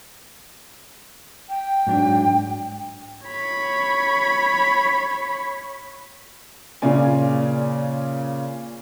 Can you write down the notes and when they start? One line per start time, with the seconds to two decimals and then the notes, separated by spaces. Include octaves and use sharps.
1.49 G5
1.87 G#2 F#3 D4
3.27 C#5 B5
6.82 A#2 C#3 C#4 D5 G#5